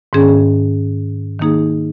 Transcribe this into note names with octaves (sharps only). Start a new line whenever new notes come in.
G#2 D#3 C#4 G#4
D#3 A#3 D#4 G#4